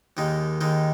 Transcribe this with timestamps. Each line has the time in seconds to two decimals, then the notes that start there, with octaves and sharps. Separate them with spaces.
0.17 D#2 D#3 G#3 D#4
0.61 D#2 D#3 G#3 D#4